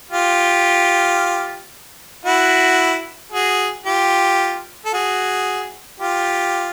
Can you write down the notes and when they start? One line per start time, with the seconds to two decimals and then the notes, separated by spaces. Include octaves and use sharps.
0.11 F4 G4
2.25 E4 F#4
3.32 F#4 G#4
3.86 F4 G4
4.85 A4
4.93 F#4 G#4
6.00 F4 G4